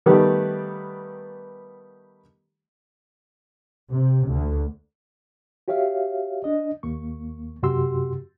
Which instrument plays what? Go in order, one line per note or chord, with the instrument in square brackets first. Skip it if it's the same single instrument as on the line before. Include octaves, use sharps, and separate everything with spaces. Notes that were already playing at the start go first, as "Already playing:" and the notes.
[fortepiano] D#3 G3 A3 B3 G4
[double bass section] C3
D2
[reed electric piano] F#4 G4 C#5 E5 F5
D4 D#5
D#2 A#3 C#6
F#2 C3 F#4 G4 C6 E6